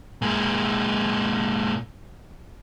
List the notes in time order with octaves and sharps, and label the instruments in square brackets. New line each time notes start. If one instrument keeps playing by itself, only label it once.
[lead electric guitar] A#2 G#3